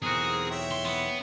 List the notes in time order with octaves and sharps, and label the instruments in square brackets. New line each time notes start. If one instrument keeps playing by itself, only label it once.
[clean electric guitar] B1 E2 F#4 [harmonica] C4 A#4 [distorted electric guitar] G#4
[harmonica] C#5 E5 G5
[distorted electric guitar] C6
B3